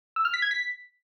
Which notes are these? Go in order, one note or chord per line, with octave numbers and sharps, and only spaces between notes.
E6
F6
B6
G#6
B6